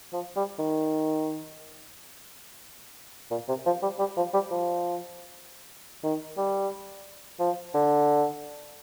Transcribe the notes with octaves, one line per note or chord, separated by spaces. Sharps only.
F3
G3
D#3
A#2
C3
F3
G3
G3
F3
G3
F3
D#3
G3
F3
D3